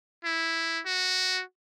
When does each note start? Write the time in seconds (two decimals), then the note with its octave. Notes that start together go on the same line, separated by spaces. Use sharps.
0.25 E4
0.86 F#4